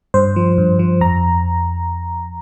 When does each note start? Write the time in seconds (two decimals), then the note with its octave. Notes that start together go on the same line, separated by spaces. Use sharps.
0.14 G2 C5
0.36 F3
0.58 G2
0.79 F3
1.01 F2 A#5